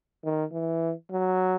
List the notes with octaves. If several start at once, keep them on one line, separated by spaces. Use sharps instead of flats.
D#3
E3
F#3